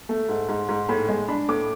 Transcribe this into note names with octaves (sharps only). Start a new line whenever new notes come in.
A3
G#2
G#2
G#2
A2 B5
G#3
D4 B5
A2 D6